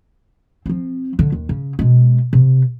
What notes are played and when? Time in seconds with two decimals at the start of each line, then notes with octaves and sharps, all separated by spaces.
0.66 F3 C4
1.19 D3
1.32 D#2
1.49 C#3
1.79 B2 G#3
2.33 C3